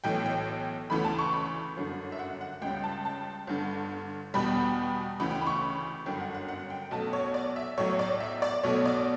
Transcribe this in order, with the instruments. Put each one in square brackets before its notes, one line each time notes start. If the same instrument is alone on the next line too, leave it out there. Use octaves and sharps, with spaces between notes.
[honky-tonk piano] B1 A2 E3 G5
G5
D2 C#3 E3 A3 B5
A5
C#6
B5
G1 F#2 D3
E5
F#5
F#5
C#2 C#3 G3 G5
A5
A5
G1 G2 D3
E2 B2 G3 B5
D2 C#3 E3 B5
G5
B5
C#6
B5
G1 F#2 D3 G5
F#5
F#5
F#5
G5
B1 B2 A3 A5
C#5
D5
E5
B1 A2 F#3 C#5
D5
E5
D5
B1 B2 A3 C#5
D5